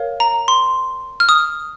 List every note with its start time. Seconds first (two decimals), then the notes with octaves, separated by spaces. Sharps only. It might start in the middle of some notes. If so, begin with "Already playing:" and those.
Already playing: A#4 C#5 F5
0.20 A#5
0.48 C6
1.20 F6
1.29 D#6